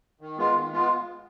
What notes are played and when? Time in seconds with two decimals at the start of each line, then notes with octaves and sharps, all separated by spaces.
0.21 D#3
0.38 G#3 B3 F4
0.55 D#3
0.72 G#3 B3 F4